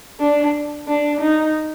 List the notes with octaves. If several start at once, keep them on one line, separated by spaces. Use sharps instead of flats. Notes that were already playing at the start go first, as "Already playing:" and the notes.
D4
D4
D#4